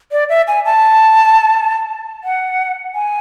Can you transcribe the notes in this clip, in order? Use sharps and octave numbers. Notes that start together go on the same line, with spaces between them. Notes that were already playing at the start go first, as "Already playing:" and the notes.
D5
E5
G#5
A5
F#5
G#5